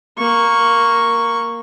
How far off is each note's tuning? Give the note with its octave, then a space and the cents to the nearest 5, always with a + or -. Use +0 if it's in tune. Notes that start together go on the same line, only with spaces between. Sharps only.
A#3 +0 C#6 +0